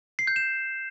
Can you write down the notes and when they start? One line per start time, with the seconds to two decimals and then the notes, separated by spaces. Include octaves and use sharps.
0.19 C7
0.27 G6
0.36 E7